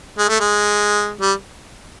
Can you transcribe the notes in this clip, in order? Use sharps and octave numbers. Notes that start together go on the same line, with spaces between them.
G#3
A3
G#3
G3